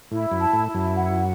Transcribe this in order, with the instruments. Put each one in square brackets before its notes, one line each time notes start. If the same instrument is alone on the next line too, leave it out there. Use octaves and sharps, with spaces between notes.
[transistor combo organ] A2 [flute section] E4
[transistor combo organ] F#2
[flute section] A5
[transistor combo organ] A2
[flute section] E4
[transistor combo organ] F#2
[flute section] F#5